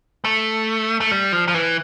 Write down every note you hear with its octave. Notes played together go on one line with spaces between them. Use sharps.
A3
A3
G3
F3
F3
E3